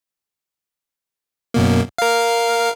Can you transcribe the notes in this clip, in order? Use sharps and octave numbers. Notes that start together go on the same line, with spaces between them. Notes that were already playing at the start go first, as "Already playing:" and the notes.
F#2 B2 A#3
A#4 F5